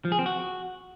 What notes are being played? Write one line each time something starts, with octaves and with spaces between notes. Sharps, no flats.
F3
G#4
C4
F#4